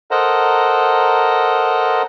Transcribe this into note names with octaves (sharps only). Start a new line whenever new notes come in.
A4 A#4 C5 D#5 F#5 A#5